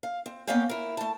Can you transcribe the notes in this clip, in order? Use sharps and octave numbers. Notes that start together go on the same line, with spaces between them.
F5
C4
A#3 B3 C#4 C#5 F5 G5
E4 A#4
A3 A5